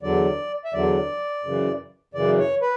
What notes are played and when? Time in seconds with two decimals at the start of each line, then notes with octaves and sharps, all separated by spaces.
0.02 E2 D3 F#3 D5
0.65 E5
0.73 E2 D3 F#3 D5
1.44 F#2 C#3 E3
2.14 F#2 C#3 E3 D5
2.39 C#5
2.62 B4